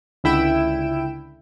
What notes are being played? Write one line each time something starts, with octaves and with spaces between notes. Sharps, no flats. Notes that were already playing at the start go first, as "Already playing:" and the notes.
C#2 D3 E4 G5 D7 E7